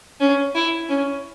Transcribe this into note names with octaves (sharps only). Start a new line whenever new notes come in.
C#4
E4
C#4